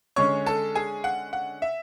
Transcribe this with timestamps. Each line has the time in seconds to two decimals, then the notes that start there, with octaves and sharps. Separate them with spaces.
0.16 D3 G#3 C#4 C#5 C#6
0.46 A4 A5
0.75 G#4 G#5
1.04 F#5
1.33 F#5
1.62 E5